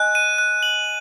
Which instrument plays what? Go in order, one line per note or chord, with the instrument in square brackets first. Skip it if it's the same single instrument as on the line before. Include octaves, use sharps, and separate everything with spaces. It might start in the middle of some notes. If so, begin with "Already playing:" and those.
Already playing: [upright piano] D#5 G#5 [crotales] F#6
[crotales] D#7
F#6
F#7